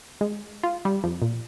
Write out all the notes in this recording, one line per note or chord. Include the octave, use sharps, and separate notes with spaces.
G#3
F4
G3
F2
A#2